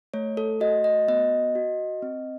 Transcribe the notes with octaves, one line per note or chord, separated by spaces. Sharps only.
A3 C#5
A4
F#4 D#5
D#5
B3 D#5
F#4
C4